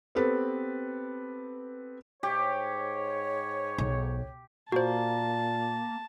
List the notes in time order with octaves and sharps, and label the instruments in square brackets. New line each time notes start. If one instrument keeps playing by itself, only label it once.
[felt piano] B3 C4 G4 A4 B4
[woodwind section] G#2 C#5 [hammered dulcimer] G4
[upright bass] B1
[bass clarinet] A#2 [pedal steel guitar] A#3 [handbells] F#4 C5 [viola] A5